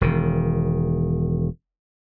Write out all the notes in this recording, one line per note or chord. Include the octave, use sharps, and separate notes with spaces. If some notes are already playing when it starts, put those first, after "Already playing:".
E1 D#3